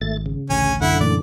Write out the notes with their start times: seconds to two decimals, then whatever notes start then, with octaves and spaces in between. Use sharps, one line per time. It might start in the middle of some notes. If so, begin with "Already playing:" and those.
0.01 G#1 A3 A6
0.26 C#3
0.50 A1 D2 C#4 G#5
0.81 F#2 D3 E4 F#5
1.01 A#2 E3 A3 D5